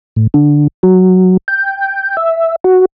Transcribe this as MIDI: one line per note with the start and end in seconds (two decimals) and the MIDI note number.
0.16 0.27 45
0.34 0.67 50
0.83 1.37 54
1.48 2.17 79
2.17 2.56 76
2.64 2.85 66